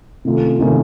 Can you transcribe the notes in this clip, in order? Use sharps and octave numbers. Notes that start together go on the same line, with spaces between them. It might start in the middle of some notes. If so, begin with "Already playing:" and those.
C3 D#3 A3 C#4 F4
C3 D#3 A3 C#4 F4